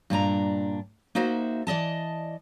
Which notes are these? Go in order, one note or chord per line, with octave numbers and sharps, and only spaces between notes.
G2 A#2 D4 A#5
A#3 D#4 F#4 C5 E5
E3 D5 D#5 A5